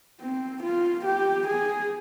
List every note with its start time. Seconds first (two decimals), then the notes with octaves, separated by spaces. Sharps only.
0.21 C4
0.63 F4
1.05 G4
1.48 G#4